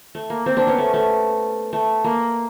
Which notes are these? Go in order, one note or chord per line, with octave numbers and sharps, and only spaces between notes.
A3
A#3
A#3 C4
C4 D4
B3 C#4
A3
A3
A3
A#3